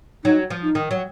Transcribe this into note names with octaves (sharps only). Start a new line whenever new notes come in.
F#3 D#4
F3
D#4
D#3
F#3